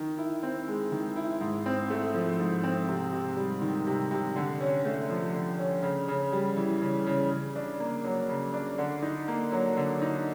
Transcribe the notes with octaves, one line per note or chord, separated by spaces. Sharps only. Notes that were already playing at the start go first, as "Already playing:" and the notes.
Already playing: D#3
E4
C4
G#3
D#3
E4
G#2
C4
A3
F3
G#2
C4
C3
C3
G3
D#3
C3
C3
D3
C#4
A3
F3
D3
C#4
C#3
C#3
G3
E3
C#3
C#3
C#3
D4
A#3
F#3
C#3
D4
D3
D#4
A#3
F#3
D3
D#4